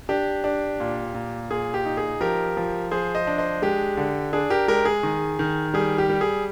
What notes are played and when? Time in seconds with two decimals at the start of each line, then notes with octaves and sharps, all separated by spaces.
0.09 D4 G4
0.44 D4
0.80 A#2
1.14 A#2
1.50 A#2 G#4
1.74 G4
1.85 D#4
1.97 G#4
2.20 F3 G4 A#4
2.57 F3
2.91 F3 G#4 C5
3.15 C5 D#5
3.27 D4
3.38 C5 D#5
3.62 G#3 G4
3.97 D3
4.33 D4 G#4
4.50 G4 A#4
4.68 G#3 G4 A#4
4.85 G#4
5.03 D#3
5.39 D#3
5.74 G3 G#4
5.98 G4
6.10 G3
6.21 G#4